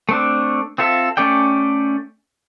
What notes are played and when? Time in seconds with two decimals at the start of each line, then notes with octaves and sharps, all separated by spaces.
0.09 A3 C4 D4
0.78 C4 F4 A4 E5
1.17 A3 C#4 A4 D5 G5